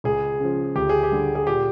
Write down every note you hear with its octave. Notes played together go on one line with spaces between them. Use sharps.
C#2 G#4
C#3 F3
D2 G4
G#4
G4
D3 G3
G#4
A#2 G4